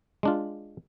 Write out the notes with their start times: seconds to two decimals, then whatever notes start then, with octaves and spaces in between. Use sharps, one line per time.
0.23 G#3 D4 F4